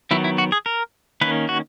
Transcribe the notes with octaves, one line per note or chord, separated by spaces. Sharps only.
D#3 F#3 B3 E4
E4
F#4
G#4
A#4
D#3 A#3 C#4 B4
F#4